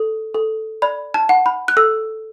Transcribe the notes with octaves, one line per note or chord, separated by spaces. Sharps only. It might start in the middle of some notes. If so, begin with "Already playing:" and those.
Already playing: A4
A4
D5 B5
A5
F#5
B5
F#6
A4 E6